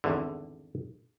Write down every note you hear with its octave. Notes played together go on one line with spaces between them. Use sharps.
G#1 E2 D3